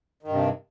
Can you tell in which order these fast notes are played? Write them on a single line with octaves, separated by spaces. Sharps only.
D#3 G2 C3